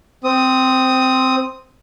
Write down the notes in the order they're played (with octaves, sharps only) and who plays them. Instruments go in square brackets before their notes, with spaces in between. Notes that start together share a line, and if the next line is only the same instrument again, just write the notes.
[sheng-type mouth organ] C4 D#6